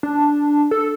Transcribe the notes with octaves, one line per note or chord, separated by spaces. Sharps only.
D4
A4